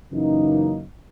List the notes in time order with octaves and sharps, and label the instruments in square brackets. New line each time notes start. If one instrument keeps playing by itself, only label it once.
[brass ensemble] F#2 C#3 E3 A#3 D#4